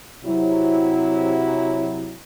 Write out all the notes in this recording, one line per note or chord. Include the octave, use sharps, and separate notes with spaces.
C3 F#3 E4